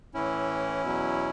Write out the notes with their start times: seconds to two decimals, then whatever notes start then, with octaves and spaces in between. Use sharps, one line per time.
0.14 A2 E3 C#4 E4
0.83 E2 B2 F#3